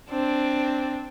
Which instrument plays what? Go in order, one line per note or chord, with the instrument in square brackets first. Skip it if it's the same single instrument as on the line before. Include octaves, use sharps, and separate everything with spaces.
[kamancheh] C4 D4